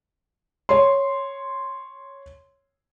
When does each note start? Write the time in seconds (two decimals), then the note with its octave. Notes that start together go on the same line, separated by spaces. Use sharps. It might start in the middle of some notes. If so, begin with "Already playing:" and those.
0.69 C#5 C6